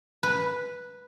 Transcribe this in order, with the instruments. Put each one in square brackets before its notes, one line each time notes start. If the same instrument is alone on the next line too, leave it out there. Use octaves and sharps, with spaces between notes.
[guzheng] B4